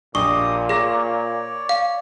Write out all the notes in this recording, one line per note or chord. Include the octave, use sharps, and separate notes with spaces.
A#1 A#2 G4 D#5 C#6 D#6
G#4 C#5 D5 D6 A#6
F5